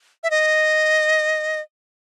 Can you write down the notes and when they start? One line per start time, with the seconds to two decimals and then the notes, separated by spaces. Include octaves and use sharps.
0.23 E5
0.30 D#5